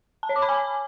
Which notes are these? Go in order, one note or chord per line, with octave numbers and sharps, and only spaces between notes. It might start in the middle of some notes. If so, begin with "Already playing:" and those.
A5
C#5
D6
B5
G#5